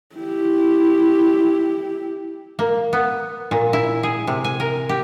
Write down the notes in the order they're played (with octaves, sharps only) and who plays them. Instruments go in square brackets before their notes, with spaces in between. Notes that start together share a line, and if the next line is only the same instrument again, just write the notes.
[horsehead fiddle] E4 G4
[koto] A#3
B3
A#2
E4
G#4
C3
G#5
A#4
G4